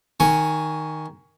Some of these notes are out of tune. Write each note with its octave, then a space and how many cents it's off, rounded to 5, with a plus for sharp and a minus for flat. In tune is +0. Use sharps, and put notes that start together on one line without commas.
D#3 +0 G#5 +0 C#6 +10